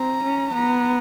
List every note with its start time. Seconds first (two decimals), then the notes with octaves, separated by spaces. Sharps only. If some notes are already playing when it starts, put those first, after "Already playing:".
Already playing: C4 A#5
0.24 C#4
0.54 B3 A#5